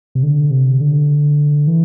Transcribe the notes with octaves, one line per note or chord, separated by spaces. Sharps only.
C3
D3
C3
D3
E3